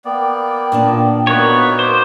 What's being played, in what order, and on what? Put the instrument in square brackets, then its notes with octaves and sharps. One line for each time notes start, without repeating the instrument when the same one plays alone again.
[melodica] A#3 B3 D5 [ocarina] G5
[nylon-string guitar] A#2 D4 A5
[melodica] A#3 D#4 F#4 [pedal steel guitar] B3 C#5 [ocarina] A#4
[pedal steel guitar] C5 [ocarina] D6